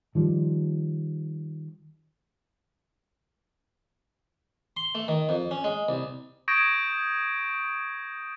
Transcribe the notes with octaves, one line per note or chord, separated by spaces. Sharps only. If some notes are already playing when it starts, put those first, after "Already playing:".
D#3 F3 G3
C6
A3
D#3
F2
C#4
G#3
C2
C#6 D#6 G6 G#6 A#6 D7